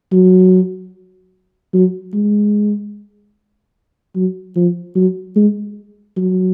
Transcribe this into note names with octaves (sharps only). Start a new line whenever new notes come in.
F#3
F#3
G#3
F#3
F3
F#3
G#3
F#3